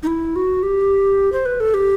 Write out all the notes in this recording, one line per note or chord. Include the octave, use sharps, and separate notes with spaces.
D#4
E4
F#4
G4
C5
B4
A4
G4